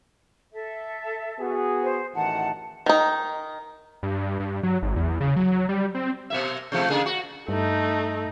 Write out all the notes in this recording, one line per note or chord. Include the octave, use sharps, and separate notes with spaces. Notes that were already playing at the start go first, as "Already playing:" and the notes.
A4 E5
B3 F#4 G#4
C5
A1 D#3 E3 F#5 A5
D#3 D#4
G2
G2
F#3
G#1
E2
C#3
F#3
G3
C4
B2 A#3 E5
C3 F3 A3
C#3 A#3 G#4
F#4
G2 A3 D#4